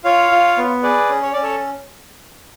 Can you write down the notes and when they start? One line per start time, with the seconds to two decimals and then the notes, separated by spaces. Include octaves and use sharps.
0.04 F4 C#5 F5
0.31 F4
0.57 B3
0.83 G#4 B4 D5
1.09 C#4
1.22 C#5
1.33 C#4 D5
1.43 A4 C#5